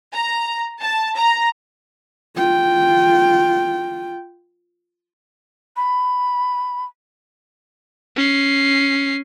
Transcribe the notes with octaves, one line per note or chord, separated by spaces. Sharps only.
A#5
A5
A#5
F4 G5
B5
C#4 C7